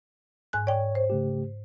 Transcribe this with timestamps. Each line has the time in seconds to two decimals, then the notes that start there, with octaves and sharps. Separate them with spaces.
0.53 G#2 G#5 F#6
0.67 C#5 D5 G5
0.95 C5
1.10 C#3 A3 G4